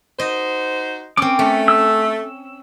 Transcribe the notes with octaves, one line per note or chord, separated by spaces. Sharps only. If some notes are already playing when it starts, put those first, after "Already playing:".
D#4 F#4 C5 D#5
C4 C#4 D6
A3 C#4
E6